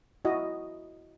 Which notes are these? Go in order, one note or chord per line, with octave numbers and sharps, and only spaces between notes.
E4 F#4 D#5